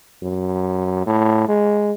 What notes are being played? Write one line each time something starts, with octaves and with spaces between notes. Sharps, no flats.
F#2
A2
G#3